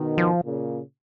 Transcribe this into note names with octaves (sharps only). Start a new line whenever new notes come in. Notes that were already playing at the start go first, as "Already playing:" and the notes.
Already playing: B2 D#3
F3
A#2 C#3